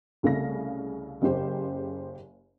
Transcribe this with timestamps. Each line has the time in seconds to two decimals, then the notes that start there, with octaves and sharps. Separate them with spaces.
0.23 C2 C#3 A3 F5 A#6
1.22 F#1 C#3 G4 C5